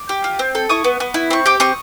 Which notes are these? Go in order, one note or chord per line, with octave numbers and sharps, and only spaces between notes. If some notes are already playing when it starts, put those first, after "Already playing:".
Already playing: D6
G4
F4
C4
A4
E4 C#6 D#6
B3
B3
E4
C4 C#6
G4 D6
C4 C#6 D#6